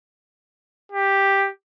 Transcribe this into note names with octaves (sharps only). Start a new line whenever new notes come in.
G4